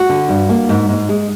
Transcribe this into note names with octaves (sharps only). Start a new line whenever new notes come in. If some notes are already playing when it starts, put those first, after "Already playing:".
Already playing: F#4
D3
G2
A#3
G#2
G#2
G#3